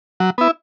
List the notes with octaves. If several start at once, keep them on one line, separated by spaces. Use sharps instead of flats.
F#3
B3 E4